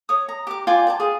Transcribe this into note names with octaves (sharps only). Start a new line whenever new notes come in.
C#5 D#6
A#5
G4 D6
F4 D5 G5 G#5
D5 G5 A5
F4 G#4